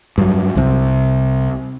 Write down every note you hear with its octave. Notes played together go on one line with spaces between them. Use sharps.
G2 F#3
C2 C3